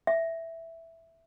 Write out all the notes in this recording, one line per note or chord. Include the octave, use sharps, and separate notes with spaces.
E5